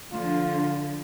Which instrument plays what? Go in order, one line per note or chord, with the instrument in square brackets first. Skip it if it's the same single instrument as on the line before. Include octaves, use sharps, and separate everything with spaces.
[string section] D3 F3 [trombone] F4